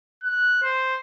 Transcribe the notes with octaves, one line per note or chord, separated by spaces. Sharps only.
F#6
C5